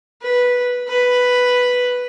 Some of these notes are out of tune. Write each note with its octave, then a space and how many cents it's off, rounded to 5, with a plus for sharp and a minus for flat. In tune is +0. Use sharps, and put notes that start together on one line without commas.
B4 -10
B4 +0